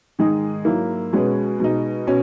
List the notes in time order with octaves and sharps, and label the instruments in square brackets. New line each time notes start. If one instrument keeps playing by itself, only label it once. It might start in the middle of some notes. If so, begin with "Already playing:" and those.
[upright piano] G#2 D#3 G#3 D#4 G#4
G#2 F#3 A#3 E4
B2 G#3 C#4 F#4 B4
B2 G#3 D#4
B2 C#4